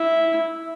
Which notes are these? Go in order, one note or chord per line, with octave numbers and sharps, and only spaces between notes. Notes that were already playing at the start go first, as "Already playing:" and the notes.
Already playing: E4